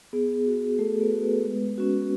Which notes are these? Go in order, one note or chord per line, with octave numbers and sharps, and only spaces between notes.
B3 G#4
F#4
A3 B3 A4
B3 B4
F#4
B3 B4
G#3
C#4 F#4